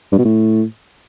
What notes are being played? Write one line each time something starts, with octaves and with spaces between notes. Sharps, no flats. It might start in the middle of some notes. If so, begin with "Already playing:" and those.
G2
B2
A2